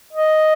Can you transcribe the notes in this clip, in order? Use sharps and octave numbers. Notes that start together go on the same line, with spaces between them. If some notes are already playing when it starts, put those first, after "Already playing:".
D#5